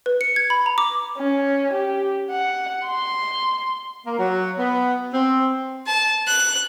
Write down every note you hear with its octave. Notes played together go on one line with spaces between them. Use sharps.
B4
C#7
G#6
B5
A#5
D6
C#4
G4
F#5
C6
A#3
F#3
B3
C4
A5
F#6